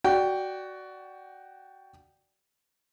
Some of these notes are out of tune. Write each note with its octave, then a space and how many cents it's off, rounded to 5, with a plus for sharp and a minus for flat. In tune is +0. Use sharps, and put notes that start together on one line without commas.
F#4 +15 D5 +0 G5 +0